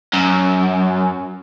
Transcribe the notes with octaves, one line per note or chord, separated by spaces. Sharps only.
F#2